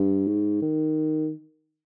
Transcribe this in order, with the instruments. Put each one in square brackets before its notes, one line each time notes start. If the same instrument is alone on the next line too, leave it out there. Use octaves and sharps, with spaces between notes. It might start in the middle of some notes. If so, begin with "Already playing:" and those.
Already playing: [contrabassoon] G2
G#2
D#3